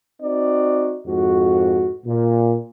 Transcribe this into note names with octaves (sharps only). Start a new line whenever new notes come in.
C4 D#4 F#4 D5
F2 G#2 F#4
A#2